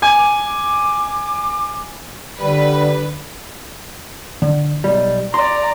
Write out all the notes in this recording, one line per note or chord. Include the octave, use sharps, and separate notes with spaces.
G#5 D6
D3 G3 B4
D3
B1 G3
D5 A#5 C6